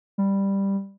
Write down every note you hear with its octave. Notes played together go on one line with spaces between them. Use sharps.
G3